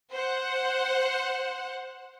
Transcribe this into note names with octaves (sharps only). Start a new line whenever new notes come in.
C5 F#5